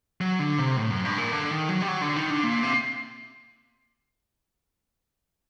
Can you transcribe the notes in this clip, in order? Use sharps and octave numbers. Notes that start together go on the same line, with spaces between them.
F#3
D3
C3
A2
F#2
G2
A#2
D3
D#3
F#3
G3
F#3
D3
D#3
D3
A#2
C3